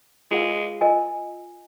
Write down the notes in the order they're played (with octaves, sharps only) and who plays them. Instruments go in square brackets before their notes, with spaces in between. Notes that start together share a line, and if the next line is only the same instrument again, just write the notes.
[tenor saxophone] G#3 [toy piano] F4 A#4 F5
[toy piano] F4 A#4 D#5 G#5